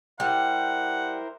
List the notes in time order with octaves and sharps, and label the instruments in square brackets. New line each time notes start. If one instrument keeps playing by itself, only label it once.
[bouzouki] G3 [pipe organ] E4 A#4 C5 [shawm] F#5